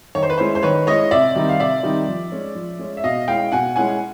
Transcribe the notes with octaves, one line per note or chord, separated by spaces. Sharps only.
D#3 C#5
C5
B4
G#3 C#4 E4 C5
C5
D#3 B4 C#5
G#3 C#4 E4 C#5 D#5
C3 D5 E5
D#3 G3 C4 D#4
F5
C3 D5 E5
D#3 G3 C4 D#4
F3
G#3 C#4
F3
G#3 C#4
E5
B2 D#5 F5
G#3 C#4 E4 F5 G5
B2 F#5 G#5
G#3 C#4 E4 F#5 G#5